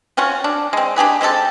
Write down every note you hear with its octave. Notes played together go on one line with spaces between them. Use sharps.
C4 C#4 F4 F#4
D4
G#3 C4
D4 G4 G#4 B4
G#3 C4 G4 A4